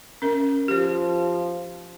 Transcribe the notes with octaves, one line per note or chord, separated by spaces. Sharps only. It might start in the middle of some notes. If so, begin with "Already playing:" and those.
C#4 A#4
F3 G4 C5